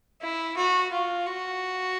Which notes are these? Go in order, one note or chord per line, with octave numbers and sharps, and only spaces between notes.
E4
F#4
F4
F#4